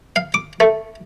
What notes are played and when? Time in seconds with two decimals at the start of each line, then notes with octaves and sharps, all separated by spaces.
0.16 F5
0.34 D6
0.60 A3